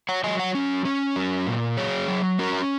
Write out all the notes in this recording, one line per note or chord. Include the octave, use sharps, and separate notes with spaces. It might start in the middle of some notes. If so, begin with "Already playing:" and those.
C#5 F#5
F#3 D#5 G#5
C#5 F#5
C#4
C#4
F#3
A#2
F#3 G#4 C#5
F#3
C#4 F#4 A#4